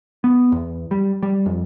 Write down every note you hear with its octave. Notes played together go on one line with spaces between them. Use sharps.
B3
E2
G3
G3
F2